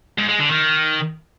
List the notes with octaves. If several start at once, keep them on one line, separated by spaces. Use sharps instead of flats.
G#2
G#3
D3
D#3